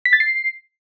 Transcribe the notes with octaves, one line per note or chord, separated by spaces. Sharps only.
B6
A6
C7